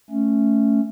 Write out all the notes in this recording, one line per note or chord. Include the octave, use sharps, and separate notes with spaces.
A3 C#4